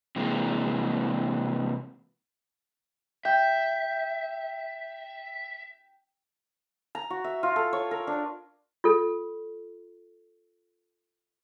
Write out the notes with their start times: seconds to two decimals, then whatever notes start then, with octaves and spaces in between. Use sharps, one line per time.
0.16 C3 E3 G#3 A#3
3.25 E5 G5
6.95 A#5
7.10 F#4
7.24 E5
7.43 F4
7.56 A4
7.73 C#5
7.91 A#4
8.07 D4
8.84 F4 A4